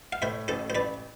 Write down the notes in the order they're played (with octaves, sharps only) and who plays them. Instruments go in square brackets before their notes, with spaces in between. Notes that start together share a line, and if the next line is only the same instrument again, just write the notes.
[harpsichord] F5
[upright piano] A2 [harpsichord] C5 E5
[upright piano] A1 [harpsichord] A4 C5
[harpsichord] C5
[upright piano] A1 [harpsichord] B4 D5